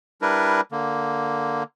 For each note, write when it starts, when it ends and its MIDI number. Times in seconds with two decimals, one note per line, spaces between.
0.22 0.61 55
0.22 0.61 62
0.22 0.61 64
0.22 0.61 70
0.22 0.61 71
0.72 1.63 50
0.72 1.63 58